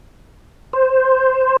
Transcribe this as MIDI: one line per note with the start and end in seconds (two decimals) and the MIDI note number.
0.73 1.57 72